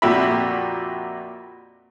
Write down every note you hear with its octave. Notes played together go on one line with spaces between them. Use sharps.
F2 A#2 F#4 G4 E5 B5